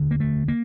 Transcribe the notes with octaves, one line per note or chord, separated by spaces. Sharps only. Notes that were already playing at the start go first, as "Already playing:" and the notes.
Already playing: E1 D2 D3
A#3
A3
A#3